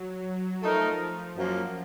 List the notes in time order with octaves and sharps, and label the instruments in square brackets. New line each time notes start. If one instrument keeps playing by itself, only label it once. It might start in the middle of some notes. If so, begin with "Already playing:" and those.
Already playing: [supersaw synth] F#3
[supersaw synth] F3 [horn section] A3 D#4 A#4
[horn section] F#2 F3 A#3